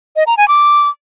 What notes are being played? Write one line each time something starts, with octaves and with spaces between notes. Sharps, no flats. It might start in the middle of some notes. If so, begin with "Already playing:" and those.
D#5
A#5
G#5
D6